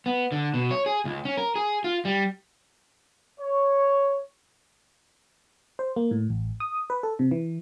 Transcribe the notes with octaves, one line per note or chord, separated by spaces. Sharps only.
B3
D3
B2
C#5
G#4
C#2
C#4
A#4
G#4
F4
G3
C#5
C5
A#3
A2
A1
D#6
B4
A4
C3
E3